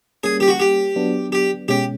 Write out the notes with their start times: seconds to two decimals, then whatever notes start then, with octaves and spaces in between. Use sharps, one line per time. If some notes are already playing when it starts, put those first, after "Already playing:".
0.24 G3 A#3 C#4 G#4
0.40 G4
0.48 F#4
0.60 G4
0.96 F#3 B3 D4
1.32 G4
1.68 B2 G#3 C#4 G4